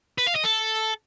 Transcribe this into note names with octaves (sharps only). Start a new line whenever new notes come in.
B4
F5
D#5
A4